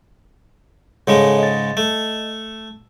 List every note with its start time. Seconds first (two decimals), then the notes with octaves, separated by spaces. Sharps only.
1.07 G#2 C#3 G#3 G#4 A4 C#5
1.39 D#5 A6
1.77 A3